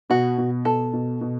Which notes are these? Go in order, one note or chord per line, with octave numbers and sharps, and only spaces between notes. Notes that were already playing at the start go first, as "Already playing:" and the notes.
B2 F#4
B2
B2 A4
B2
B2